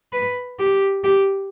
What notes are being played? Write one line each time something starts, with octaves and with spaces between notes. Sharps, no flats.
B4
G4
G4